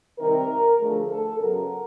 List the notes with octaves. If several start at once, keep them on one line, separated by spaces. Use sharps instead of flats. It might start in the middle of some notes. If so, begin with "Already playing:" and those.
C3 D#3 G3 A#4
D2 D3 F3 A3 G#4
A4
F#2 C#3 F#3 B3 A#4